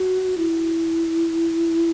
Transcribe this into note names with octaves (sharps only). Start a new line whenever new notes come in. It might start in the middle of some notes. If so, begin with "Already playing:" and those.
Already playing: F#4
E4